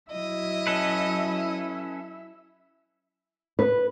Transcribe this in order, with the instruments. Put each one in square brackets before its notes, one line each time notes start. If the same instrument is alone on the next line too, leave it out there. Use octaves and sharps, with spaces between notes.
[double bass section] F#3 [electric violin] E4 E5 [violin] D#5
[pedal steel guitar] C#4 A4 B4
[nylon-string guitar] B4